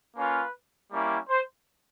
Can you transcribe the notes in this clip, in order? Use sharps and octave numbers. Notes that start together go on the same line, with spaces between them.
A#3 C#4 F4 B4
G3 A#3 C#4 E4
C5